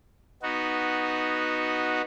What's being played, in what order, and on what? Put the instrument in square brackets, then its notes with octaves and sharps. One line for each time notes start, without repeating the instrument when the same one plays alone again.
[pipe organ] B3 D#4 F#4